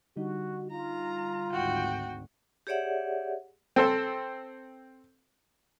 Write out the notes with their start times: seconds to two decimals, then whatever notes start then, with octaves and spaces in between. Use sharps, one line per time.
0.16 D3 G3 D#4 F#4
0.71 F4 A#5
1.53 G#1 D2 F#4 G5
2.67 G4 G#4 C#5 D5 E5 F#5
3.76 C4 A4 C5